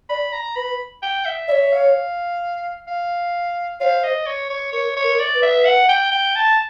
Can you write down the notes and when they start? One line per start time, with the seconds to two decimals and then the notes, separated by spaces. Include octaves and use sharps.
0.09 D5 B5
0.32 A#5
0.56 B4 B5
1.02 G5
1.25 E5
1.48 C#5 D5 E5
1.72 F5
2.87 F5
3.80 C5 C#5 F5
4.04 D#5
4.27 C#5
4.50 C#5
4.72 A#4 C#5
4.96 C#5
5.04 A#4
5.19 D5
5.35 B4
5.42 E5
5.65 F#5
5.89 G5
6.12 G5
6.35 A5